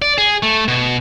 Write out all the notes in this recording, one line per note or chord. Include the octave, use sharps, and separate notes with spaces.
D5
G#4
A3
B2